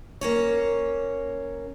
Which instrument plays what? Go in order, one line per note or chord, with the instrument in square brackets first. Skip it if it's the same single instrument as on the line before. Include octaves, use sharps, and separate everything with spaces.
[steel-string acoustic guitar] A#3 C#4 C#5